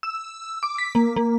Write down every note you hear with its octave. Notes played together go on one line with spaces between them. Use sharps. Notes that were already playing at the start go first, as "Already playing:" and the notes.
E6
D6
B6
A#3
A#3